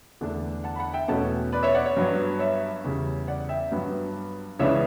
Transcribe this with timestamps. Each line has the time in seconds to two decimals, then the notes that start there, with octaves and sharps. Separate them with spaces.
0.21 E2 D3 A3 D4
0.64 F#5 A5
0.76 B5
0.79 F#5 A5
0.94 E5 G5
1.08 E2 B2 A3 C#4 F#5 A5
1.52 B4 D5
1.63 C#5 E5
1.75 D5 F#5
1.86 C#5
1.97 G2 F#3 B3
2.39 C#5 E5
2.84 E2 C#3 G3
3.28 D5 F#5
3.49 E5 G5
3.71 G2 F#3 B3
4.59 C#2 C#3 E3 B3 D4 C#5 E5